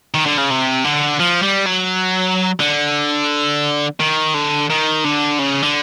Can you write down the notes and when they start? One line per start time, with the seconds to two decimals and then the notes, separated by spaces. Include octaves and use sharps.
0.14 D#3
0.26 D3
0.37 C#3
0.50 C3
0.84 D3
1.20 F3
1.43 G3
1.66 F#3
2.60 D3
4.00 D#3
4.35 D3
4.70 D#3
5.05 D3
5.39 C#3
5.63 D3